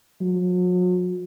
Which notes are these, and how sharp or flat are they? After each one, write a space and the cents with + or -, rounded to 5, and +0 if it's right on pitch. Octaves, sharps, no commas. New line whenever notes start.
F#3 -40